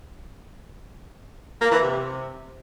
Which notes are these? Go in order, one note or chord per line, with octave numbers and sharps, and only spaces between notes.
A#3
E3
C3